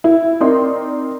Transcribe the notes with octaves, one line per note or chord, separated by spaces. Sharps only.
E4
C4 D#4 A#4 D5 C6